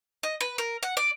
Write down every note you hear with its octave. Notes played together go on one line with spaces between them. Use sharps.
D#5
B4
A#4
F#5
D5